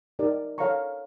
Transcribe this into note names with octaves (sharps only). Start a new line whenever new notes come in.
D#4 G4 A#4 D5
A4 C#5 F5 A#5 C#6